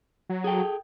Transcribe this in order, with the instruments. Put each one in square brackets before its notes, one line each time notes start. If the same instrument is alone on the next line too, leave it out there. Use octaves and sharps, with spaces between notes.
[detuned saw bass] F#3
[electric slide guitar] G#4 A4 G5